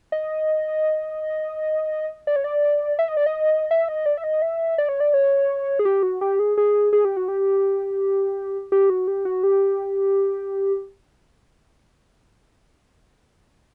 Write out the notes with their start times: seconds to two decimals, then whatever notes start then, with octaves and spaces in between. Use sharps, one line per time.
0.12 D#5
2.27 D5
2.36 C#5
2.44 D5
2.99 E5
3.08 D#5
3.17 D5
3.26 D#5
3.71 E5
3.88 D#5
4.06 D5
4.17 E5
4.24 D#5
4.42 E5
4.78 D5
4.89 C#5
5.00 D5
5.14 C#5
5.79 G#4
5.85 G4
6.03 F#4
6.21 G4
6.39 G#4
6.58 G#4
6.93 G#4
7.05 G4
7.16 F#4
7.28 G4
8.72 G4
8.90 F#4
9.08 G4
9.25 F#4
9.43 G4